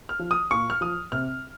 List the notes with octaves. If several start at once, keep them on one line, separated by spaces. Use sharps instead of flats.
F6
F3
D#6
A#2 C#6
F6
F3 D#6
C3 F6